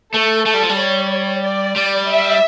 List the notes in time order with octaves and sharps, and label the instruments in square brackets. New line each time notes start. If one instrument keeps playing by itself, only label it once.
[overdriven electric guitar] A3 [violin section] A4
[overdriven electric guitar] A3 [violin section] A4
[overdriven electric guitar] G3
F3
G3
[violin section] C#5
D5
[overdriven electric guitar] G3
[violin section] E5